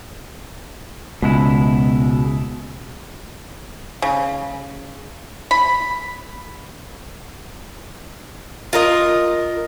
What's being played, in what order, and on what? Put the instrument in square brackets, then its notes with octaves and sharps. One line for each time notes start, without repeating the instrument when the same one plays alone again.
[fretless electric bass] C#2 [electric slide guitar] B2 G#3 E4
[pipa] C#3
B5
[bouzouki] F4 A#4 D#5